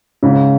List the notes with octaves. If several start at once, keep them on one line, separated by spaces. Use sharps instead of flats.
G#2 C#3